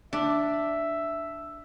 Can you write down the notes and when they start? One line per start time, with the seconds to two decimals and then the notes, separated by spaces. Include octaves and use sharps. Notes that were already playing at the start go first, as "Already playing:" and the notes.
0.13 D4 E5